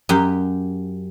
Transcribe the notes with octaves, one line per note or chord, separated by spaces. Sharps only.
F#2 G4